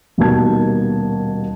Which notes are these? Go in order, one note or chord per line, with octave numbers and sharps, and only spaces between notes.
D#1 D#2 B2 A#3 A5 G#6